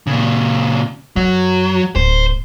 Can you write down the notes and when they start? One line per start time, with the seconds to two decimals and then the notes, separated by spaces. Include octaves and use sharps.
0.07 A#2 C#3
1.16 F#2 F#3
1.96 D1 C5